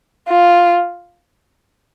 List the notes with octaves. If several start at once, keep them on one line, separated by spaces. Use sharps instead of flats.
F4